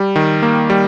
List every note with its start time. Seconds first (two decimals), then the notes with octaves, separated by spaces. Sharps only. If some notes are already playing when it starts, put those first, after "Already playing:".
Already playing: G3
0.16 D#3
0.42 A#3
0.70 G3